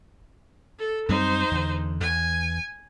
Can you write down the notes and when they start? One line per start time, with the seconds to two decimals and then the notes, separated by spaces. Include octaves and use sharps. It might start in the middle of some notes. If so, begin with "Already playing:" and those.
0.79 A4
1.09 F#2 G3 C4 D#4 C5
1.51 E2 D3
2.00 E2 G#5